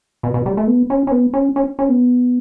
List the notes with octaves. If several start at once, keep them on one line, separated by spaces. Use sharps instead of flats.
B2
B2
G3
A3
B3
C#4
C#4
B3
C#4
C#4
C#4
B3